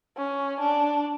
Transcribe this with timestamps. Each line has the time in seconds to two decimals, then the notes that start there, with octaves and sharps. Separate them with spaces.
0.17 C#4
0.60 D4